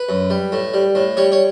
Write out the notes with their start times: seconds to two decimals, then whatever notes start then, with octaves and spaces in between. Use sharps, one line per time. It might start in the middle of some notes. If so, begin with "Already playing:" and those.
Already playing: B4
0.09 F#2
0.30 G3
0.52 A2
0.74 G3
0.95 A2
1.17 G3 C#5
1.32 C#5